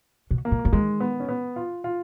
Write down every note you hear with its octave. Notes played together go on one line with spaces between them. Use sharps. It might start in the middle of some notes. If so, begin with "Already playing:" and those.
B2
A#3
A#2
F3
D#3 G#3
B3
C#4
B3
F4
F4